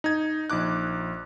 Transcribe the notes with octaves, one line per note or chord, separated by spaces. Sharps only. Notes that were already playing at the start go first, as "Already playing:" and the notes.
D#4 G#6
A#1 D#4 D6 F#6